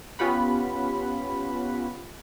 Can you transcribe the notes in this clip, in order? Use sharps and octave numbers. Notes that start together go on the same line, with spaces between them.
B3 C#4 F4 G4 F#5 B5